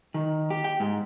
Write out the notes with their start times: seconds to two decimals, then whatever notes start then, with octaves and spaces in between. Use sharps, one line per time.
0.14 D#3
0.50 G4
0.64 G5
0.80 G#2